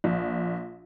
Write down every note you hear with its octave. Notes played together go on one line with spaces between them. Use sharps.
A#1